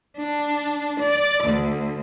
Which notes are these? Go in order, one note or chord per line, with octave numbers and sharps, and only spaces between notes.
D4
D5
D2